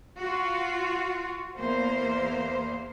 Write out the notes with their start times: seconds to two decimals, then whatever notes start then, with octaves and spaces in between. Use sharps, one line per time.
0.18 F4 F#4
1.58 E2 A#3 C5